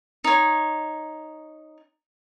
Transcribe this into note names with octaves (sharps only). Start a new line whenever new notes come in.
D#4 C#5